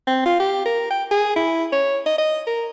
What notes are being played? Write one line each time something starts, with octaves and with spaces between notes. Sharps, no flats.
C4
F4
G4
A#4
G5
G#4
E4
C#5
D#5
D#5
A#4